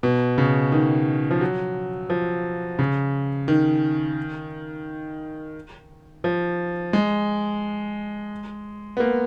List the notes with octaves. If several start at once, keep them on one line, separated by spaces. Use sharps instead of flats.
B2
C#3
D#3
F3
F#3
F3
C#3
D#3
F3
G#3
B3
A#3